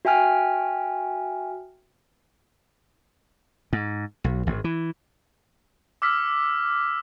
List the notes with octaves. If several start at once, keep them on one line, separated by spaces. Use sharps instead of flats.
F#4 E5 G5 G#5 F6
G#2
B1
G#1
E3
D6 E6 F6 B6